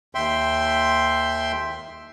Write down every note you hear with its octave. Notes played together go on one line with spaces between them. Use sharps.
D#2 E5 G5 C6